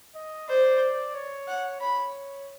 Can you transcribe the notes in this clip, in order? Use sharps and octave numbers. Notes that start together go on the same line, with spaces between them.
D#5
C5 D5
C#5
F#5
C#5 B5